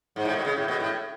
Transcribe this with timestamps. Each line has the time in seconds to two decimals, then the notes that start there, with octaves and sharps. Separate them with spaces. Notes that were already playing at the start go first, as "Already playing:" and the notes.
0.16 G#2
0.25 A2
0.36 B2
0.45 C#3
0.57 A2
0.68 B2
0.80 A2